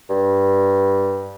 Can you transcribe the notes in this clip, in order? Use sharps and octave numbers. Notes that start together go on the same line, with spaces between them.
G2